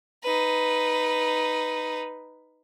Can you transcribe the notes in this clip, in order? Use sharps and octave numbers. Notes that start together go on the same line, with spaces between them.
D#4 B4